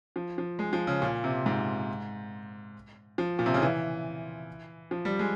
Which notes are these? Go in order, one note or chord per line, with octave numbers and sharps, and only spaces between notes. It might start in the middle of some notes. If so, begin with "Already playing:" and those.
F3
F3
G#3
F3
C#3
A#2
C3
G#2
F3
A#2
C3
C#3
E3
F3
G3
G#3